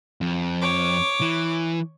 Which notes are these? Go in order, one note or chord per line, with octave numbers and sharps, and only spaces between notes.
F2
C#5 D6
E3